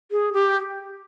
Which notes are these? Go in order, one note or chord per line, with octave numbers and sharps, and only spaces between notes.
G#4
G4